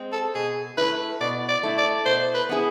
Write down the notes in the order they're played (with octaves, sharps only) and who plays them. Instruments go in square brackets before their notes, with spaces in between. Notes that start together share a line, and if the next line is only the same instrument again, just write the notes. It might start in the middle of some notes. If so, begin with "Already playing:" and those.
Already playing: [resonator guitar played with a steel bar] G#3 C4
[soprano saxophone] A4
[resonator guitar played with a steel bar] B2 [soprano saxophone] G#4
[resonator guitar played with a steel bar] A3 E4 [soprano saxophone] B4
[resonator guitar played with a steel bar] B2 [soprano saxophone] D5
[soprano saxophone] D5
[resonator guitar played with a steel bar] A3 E4
[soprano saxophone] D5
[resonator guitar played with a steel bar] B2 [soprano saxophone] C5
[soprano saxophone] B4
[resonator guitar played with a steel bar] B3 E4 G#4